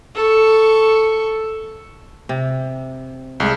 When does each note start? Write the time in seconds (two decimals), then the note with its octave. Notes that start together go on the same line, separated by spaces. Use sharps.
0.15 A4 C#6
2.29 C3
3.40 C2 G#3